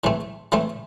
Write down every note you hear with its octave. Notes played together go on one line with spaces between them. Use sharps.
A2 E3 A3 C4
A2 E3 A3 C4